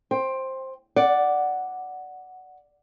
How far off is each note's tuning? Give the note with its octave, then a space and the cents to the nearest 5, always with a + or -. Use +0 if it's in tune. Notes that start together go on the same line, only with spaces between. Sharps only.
C5 +10 G5 +15
D5 +0 F#5 +0